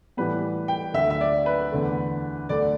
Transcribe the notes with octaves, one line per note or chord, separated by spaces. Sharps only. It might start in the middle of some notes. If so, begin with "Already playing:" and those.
A2 E3 G3 B3 B4
G5
D2 D3 A3 E5
E5
D5
B4
E2 D3 A3
D2 D3 A3 D5